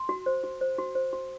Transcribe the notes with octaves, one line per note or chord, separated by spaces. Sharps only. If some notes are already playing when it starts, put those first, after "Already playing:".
Already playing: C6
F#4
C5
F#4
C5
F#4
C5
F#4